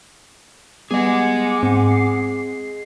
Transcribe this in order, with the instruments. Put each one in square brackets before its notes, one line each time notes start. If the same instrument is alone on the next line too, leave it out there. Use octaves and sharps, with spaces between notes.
[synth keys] G3 B3 [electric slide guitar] G#4 D#5 [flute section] F#5 G#5 D6
[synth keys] G#2 [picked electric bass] C4
[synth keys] C7